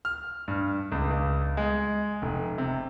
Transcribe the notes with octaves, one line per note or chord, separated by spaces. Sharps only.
F6
G2
C#2
C#2
G#3
F1
C3